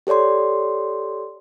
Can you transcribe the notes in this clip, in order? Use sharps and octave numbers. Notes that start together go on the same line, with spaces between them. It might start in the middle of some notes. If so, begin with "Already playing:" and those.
G4 A4 C#5 D5 C6